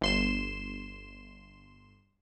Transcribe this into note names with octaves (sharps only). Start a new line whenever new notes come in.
G1 C6 E7